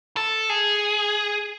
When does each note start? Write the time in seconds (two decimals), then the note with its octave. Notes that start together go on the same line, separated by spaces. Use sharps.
0.17 A4
0.49 G#4